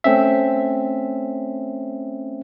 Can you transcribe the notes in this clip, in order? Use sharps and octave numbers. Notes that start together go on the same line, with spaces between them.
A3 C4 C#4 E5